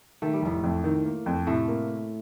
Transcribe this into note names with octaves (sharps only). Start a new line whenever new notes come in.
D#3 A3
G3
F1 A2 A3
F2
D#3
A#3
F2
A2 C3 A3
A#3